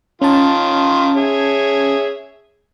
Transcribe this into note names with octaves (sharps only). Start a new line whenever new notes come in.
D#3 C#4 F4 A5
G#4 C#5 E5